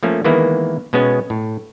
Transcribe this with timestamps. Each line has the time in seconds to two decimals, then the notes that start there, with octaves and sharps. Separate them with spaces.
0.03 F3 A3 A#3 C#4
0.24 D#3 E3 G#3 A#3 B3 E4
0.93 B2 G#3 B3 C#4
1.30 A2